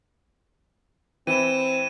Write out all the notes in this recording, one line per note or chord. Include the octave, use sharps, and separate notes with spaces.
E3 C4 E4 D#7 E7